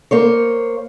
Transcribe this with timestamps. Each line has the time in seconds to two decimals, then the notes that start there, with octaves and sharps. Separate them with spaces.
0.11 A#3 C5 C#5